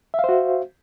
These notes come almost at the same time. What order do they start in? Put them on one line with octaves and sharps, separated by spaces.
E5 F5 C5 F#4